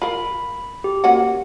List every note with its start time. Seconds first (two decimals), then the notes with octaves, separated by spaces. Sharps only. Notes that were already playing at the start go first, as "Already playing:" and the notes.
0.02 F4 A#4 B5
0.84 G4
1.04 A#3 C#4 F#4